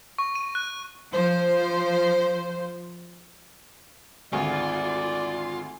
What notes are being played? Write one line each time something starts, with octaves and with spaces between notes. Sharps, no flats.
C#6
D#7
F#6
F3 C5
G#1 D2 F4 D5 G#5